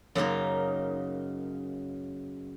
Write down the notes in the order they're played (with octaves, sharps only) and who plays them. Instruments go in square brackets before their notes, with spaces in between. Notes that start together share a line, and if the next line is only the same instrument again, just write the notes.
[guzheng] F#2 C#3 A#3 D#4